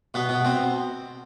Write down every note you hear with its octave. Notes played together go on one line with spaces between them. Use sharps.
B2 B3
B2
B2 C4